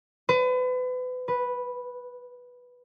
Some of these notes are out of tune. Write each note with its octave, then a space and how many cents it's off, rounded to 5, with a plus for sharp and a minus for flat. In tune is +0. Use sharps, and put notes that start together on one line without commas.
B4 +35
B4 -5